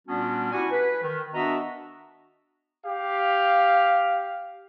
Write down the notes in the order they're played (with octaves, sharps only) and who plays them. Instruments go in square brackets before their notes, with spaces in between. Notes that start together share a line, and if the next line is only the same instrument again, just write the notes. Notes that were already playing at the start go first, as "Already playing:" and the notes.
[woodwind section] A#2 G3 B3 C#4 D4 F#4
E4 F#4 G4 F#5 G#5
B4
D#3
B3 D4 F#4 D#5 E5 A#5
[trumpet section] G4 F5